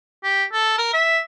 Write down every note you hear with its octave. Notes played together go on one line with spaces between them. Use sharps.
G4
A4
A#4
E5